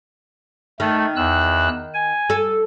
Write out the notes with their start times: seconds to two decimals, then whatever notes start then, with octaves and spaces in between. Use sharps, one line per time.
0.80 D#3 A3
1.16 E2 E6 F#6
1.94 G#5
2.30 A4